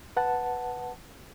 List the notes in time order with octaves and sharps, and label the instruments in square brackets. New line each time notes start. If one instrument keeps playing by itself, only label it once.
[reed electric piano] B4 F#5 A5